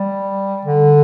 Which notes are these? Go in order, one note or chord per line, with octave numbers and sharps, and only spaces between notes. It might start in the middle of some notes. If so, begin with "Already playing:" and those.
Already playing: G3
D3